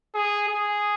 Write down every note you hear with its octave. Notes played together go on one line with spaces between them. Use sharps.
G#4
G#4